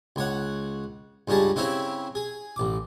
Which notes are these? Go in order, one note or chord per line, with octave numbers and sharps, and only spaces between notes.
C#2 C#5 F#5
C#2 G2 C#4 G#4 A5
C#3 C4 C#4 E4 C5 C#5
G#4
A1 D6